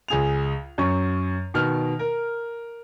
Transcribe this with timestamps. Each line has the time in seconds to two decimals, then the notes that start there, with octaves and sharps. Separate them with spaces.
0.08 C#2 G#4 F7
0.78 F#2 C#4 C#6
1.54 B2 D#3 F6
1.99 A#4